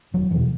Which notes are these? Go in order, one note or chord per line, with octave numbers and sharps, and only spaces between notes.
E1 F#3
E2 B2 E3